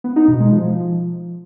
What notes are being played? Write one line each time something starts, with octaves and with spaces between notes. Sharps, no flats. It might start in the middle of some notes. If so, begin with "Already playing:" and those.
B3
D#4
B2
G#3
F3